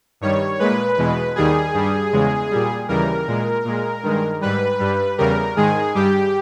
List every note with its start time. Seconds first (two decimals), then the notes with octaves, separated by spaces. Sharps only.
0.21 G2 D#3 G3 C#5
0.59 A#2 G#3 B4
0.97 E2 B2 G#3
1.35 D#2 D#3 G3 G#4
1.74 G2 G3
2.13 E2 C#3 G#3
2.51 A#2 G3
2.88 D#2 C#3 E3 G3 A#4
3.27 A#2 G#3
3.65 A#2 G#3
4.03 G2 D#3 G#3
4.41 G#2 G3 B4
4.79 G2 G3
5.18 E2 C#3 G3 A#4
5.56 G#2 D#3 G#3 G#4
5.95 G2 G3 G4